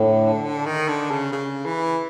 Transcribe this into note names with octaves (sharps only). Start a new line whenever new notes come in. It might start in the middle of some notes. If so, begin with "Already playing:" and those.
Already playing: A2 D3
D#3
D3
C#3
C#3
E3